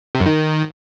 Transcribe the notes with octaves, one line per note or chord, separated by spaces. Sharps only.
C3
F#2
D#3